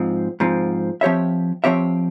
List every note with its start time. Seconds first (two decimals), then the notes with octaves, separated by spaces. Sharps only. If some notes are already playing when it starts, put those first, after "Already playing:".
Already playing: G#2 F3 C4
0.40 G#2 F3 C4
1.01 F3 C4 G4 C#5 E5
1.64 F3 C4 G4 C#5 E5